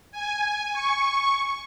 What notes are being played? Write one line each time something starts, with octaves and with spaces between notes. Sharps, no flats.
G#5
C#6